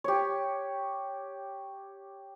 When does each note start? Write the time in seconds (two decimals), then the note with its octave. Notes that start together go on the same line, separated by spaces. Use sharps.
0.04 G4 C#5